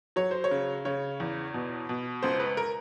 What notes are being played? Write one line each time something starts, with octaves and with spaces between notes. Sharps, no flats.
F#3 C#5
C5
C#5
C#3
C#3 C#5
E2
B2
B2
C#2 C5
B4
A#4